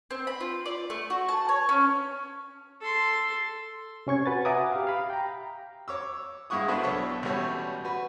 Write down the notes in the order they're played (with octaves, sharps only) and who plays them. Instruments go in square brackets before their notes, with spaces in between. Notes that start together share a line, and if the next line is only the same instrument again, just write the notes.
[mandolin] C4
B5
F4
D5
A3
F#4
A5
C#5
C#4
[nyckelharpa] A4 C6
[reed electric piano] C3 C#4 C#6 G#6
F#4 B4 G#5 A6
E5 F#5 G#5 A#5 D6 D#6
G4 F5
F5 B5
G5 A#5
[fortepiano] C#5 D6 E6
G2 G#3 E4 F#5 C#6 D#6
B3 D4 E4 F#4 A4 C5
B1 B3 A4 C#5 C#6 E6
A1 B2 G3 F#4 C#5
F#4 B4